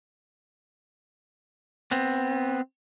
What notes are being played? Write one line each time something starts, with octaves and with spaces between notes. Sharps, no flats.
B3 C4